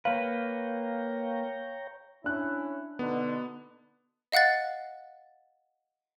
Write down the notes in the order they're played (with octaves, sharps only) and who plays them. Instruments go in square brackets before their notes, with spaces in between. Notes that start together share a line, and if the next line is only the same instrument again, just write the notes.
[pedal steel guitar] A#3 B4 [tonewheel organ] C#5 G5 A#5 [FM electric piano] F5
[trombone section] C#4 E4 [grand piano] D4 F#6
[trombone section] B2 D3 D#4 [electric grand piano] B3
[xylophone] D#5 F5 F#5 F#6 A6